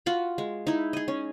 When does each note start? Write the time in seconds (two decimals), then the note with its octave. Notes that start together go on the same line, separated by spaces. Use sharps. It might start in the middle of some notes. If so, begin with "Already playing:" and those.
0.06 F4 F#4 B5
0.38 G#3
0.67 D#4 E4
0.93 G#4 D#5
1.08 C#4